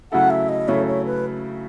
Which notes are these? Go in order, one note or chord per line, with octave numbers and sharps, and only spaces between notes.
C#3 F#3 A3 E4 A4 F#5
E5
D#5
C#3 F#3 A3 E4 A4 C#5
C#5
B4